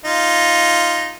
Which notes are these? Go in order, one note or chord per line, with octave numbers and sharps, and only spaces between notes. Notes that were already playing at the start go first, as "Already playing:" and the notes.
D#4 F4